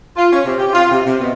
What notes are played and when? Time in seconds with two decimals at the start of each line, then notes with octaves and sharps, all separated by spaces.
0.17 F4
0.33 C#4
0.45 C3
0.59 G4
0.73 F4
0.91 C3
1.05 C3
1.21 B2